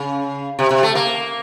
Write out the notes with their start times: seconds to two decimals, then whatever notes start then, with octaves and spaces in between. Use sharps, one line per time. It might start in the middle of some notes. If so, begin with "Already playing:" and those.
Already playing: C#3
0.59 C3
0.71 C3
0.83 A3
0.95 A#3